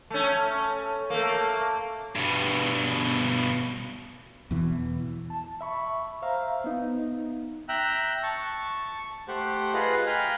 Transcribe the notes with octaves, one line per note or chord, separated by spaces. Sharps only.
A3 C#4
A3 A#3
G2 B2
E2 B2 E3
A5
E5 B5 C#6
C5 E5 F5 A#5
B3 D#4
E5 G5 A#5 E6 F#6
A5 C#6
A3 G4 C5 F#5
F4 G#4 B4 D#5 F#5 C6
F5 G5 G#5 A#5 B5